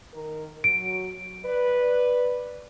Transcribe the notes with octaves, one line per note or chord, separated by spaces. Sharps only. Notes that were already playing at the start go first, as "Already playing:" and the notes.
D#3 A#4
F#3 D7
B4 D5